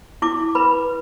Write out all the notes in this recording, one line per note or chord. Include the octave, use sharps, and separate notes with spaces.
E4 D6
B4 B5